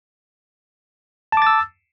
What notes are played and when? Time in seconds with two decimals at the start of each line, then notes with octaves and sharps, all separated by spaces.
1.32 A5
1.37 D6
1.42 A6
1.47 E6